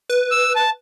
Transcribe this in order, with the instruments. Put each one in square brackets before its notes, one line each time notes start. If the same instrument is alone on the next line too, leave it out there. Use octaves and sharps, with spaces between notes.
[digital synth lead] B4
[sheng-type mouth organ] E6
A5